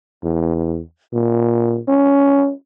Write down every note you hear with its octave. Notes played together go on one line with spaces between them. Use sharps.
E2
A#2
C#4